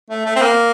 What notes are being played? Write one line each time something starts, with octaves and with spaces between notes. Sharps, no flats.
A3
A3
C4
A#3